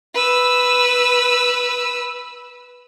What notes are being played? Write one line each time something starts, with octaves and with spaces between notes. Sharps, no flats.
B4 E6